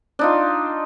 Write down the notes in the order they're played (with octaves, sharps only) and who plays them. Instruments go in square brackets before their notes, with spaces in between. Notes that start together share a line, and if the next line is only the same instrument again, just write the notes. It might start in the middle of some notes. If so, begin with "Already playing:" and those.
[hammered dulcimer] D4 D#4 F4